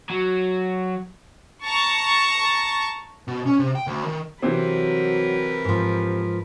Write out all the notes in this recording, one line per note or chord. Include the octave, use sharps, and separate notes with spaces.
F#3
A5 A#5 C#6
B2
C#4
C3
G5
D2
D#3
C3 E3 F#3 C4 A#4 B4
G#2 F3